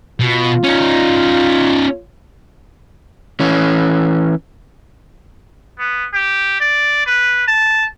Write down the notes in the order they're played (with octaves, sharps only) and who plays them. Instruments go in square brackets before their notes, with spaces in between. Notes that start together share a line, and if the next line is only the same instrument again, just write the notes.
[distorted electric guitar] B2 [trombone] F4
[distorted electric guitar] C#4 D#4
[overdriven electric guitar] E3 C#4
[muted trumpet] B3
G4
D5
B4
A5